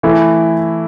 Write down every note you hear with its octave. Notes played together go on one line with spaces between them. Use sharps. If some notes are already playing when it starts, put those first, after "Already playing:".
E3 A3 E4